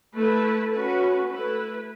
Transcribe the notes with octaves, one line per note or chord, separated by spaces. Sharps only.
A3 E4 B4
C#4 F#4 B4
A3 E4 B4